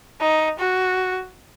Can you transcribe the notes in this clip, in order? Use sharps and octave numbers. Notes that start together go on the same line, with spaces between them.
D#4
F#4